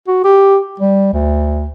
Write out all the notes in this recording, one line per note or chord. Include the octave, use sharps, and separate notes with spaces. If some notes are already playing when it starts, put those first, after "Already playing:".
F#4
G4
G3
D2